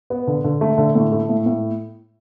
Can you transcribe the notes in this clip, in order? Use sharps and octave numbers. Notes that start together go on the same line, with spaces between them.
B3
D3
D3
A3
D3
A2
A3
A2
A2